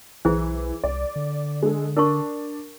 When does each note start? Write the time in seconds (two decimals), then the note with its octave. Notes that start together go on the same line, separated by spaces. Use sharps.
0.25 B1 E3 E4 G#4 C5
0.84 C2 D5
1.16 D3
1.63 G#3 D4 A4
1.97 D4 A#4 A5 C#6